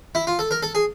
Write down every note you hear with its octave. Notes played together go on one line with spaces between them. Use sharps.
E4
F4
A4
A#4
A4
G#4